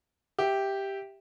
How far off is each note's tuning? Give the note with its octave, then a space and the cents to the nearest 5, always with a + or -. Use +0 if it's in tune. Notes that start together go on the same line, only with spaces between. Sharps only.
G4 +0 E5 +0